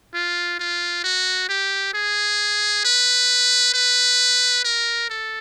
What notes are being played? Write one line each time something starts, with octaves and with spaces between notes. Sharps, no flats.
F4
F4
F#4
G4
G#4
B4
B4
A#4
A4